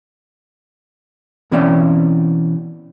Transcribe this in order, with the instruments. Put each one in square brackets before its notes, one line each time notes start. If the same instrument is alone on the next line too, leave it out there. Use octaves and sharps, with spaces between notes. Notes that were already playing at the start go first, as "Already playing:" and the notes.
[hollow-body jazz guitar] B2 E3 C4 C#4 D5 G5